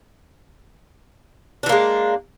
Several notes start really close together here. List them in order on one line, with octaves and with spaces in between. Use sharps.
D4 E3 A#3 G#3